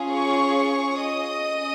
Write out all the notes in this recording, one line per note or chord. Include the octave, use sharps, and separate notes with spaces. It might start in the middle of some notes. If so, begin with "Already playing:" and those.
Already playing: C#4 F4 G#4
C#5 C#6
D#5 D#6
C#4